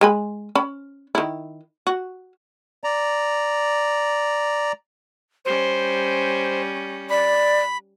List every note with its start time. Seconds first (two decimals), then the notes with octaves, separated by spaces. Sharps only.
0.01 G#3 G#5 B5
0.55 C#4 B5
1.15 D#3 E4
1.87 F#4
2.84 D5 A#5
5.45 G3 C#4 C5
7.10 D5 B5